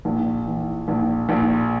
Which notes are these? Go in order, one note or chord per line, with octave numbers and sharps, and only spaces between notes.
A#1
E3
A#1
A#1